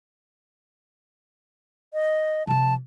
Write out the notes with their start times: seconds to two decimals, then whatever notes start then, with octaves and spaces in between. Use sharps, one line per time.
1.94 D#5
2.47 C3 F3 A5